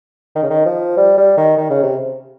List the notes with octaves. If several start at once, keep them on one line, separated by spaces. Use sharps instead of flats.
D#3
C#3
D#3
F3
G3
G3
D#3
D#3
C#3
C3